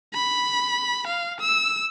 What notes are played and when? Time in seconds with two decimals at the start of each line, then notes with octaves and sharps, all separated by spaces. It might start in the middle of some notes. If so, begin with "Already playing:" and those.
0.13 B5
1.07 F5
1.40 E6